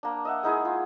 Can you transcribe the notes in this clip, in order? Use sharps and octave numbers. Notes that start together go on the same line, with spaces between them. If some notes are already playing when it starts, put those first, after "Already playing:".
A#3 D4
D#5 E5 F#5
G#3 D#4 E4 G#4
F4